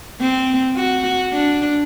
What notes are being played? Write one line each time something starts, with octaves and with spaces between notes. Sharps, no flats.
C4
F#4
D4